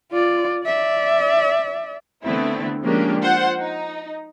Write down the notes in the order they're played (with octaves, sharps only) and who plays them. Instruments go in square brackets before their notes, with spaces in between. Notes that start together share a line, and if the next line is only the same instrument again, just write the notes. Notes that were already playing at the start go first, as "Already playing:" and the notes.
[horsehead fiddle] F4 D5
D5 E5
[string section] D3 A3 B3 C4 E4
F3 G#3 A#3 C#4 D4 G4
F4 C5 F#5
D#4